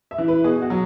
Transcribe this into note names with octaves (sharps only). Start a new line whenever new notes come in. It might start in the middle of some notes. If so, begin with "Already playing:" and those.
E5
E3
B4
B2 G#4
F#4
F#3